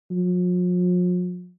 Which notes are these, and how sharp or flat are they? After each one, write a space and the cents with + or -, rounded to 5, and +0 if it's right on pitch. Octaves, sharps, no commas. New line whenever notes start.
F3 +45